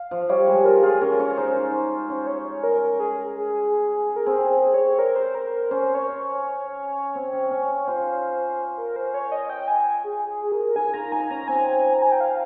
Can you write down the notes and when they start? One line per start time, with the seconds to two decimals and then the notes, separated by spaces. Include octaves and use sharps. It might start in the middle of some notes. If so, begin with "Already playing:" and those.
Already playing: F5
0.11 F3
0.29 G3 C#5
0.47 G#3
0.65 F4 A#4
0.83 F4 G#4
1.01 C#4 A#4
1.20 C#4 C#5
1.37 D#4 C5
2.09 C#4 C5
2.27 C#5
2.46 C#5
2.63 A#4
2.82 A#4
3.00 G#4
3.35 G#4
4.16 A#4
4.26 C4 G#4
4.51 G#4
4.74 C#5
4.99 A#4
5.16 C5
5.35 A#4
5.52 A#4
5.71 C#4 C5
5.95 C#5
6.19 C#5
7.15 C4
7.33 C#4
7.51 C#4
7.88 F4 C5
8.77 A#4
8.96 C5
9.14 C#5
9.32 D#5
9.50 G5
9.68 G#5
10.04 G#4
10.28 G#4
10.52 A#4
10.76 D#4 G#5
10.94 F4 A#5
11.12 D#4 G#5
11.30 C#4 A#5
11.48 C4 G#5
11.94 A#5
12.02 G#5
12.12 G5
12.21 F5